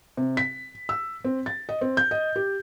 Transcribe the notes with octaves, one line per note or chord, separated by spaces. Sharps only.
C3
B6
E6
C4
A6
D#5
C4
G6
D#5
G4